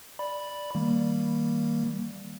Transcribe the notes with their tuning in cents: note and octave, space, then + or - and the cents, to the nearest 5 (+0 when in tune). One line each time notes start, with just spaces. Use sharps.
D5 +0 B5 -5
D#3 +30 G3 +0 A#3 +0